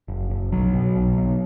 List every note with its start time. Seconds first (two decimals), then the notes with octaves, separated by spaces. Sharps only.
0.08 F#1
0.30 F#1
0.52 B1 F#3
0.74 B2
0.96 B1
1.18 B1